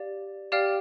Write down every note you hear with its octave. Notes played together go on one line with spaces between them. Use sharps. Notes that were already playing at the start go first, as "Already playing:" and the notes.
Already playing: G4 D5 F5
G4 D5 F5 G5 F6